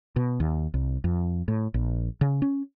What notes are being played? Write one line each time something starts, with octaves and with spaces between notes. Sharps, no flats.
B2
D#2
C2
F2
A2
A#1
C#3
C#4